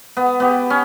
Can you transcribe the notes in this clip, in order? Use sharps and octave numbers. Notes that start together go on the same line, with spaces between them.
B3
B3 G4
C#4